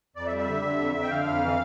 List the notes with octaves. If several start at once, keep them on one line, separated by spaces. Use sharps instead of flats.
F2 D5
E5
G3
E5
D3
D3
F2
F2
G5
D3 F5
F2
E3